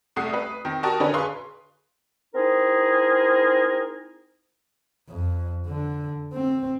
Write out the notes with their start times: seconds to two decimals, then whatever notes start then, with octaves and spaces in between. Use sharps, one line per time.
0.16 C2 C3 A3 F#5 D#6 C7
0.34 B4
0.65 D#3 C4
0.83 F#4 G4 A#4 A5 C#6 D#6
1.00 D3 A#4 B4 C#5 G#5
1.14 G#4 B4 F5 C6 C#6
2.34 C4 D#4 E4 G#4 A#4
5.09 F2
5.67 D3
6.34 C4